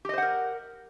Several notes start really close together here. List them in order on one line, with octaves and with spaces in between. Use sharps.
G4 D#5 C5 F#5 A#4